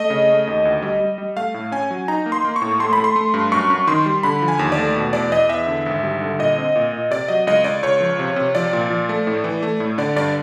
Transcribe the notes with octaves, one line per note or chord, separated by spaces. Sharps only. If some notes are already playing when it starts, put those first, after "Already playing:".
Already playing: A3 D#5
C#3
A3
D#2
D2
G3
G3
G3
A3 F5
A2
C#4 G#5
F#3
D#4 A#5
A#3
C6
A#3
C#6
A2
A3 C6
A3 B5
C6
A3
G2
F#2 C#6
F#2
D#3 C6
G3
D3 B5
F3
G#5
D#2
D5
A3
B2
E2 D5
E2 D#5
E2 E5
D3
G#1
G3
D3
A#2 D#5
C4
A#2
A#2
C3 D5
F#3 D#5
C#2 D#5
C#2 D5
C#2 C#5
F3
C3
C3
F3 D5
A#2
F3
A3
A2
E3
A3
A2
D3 D5
G2 D5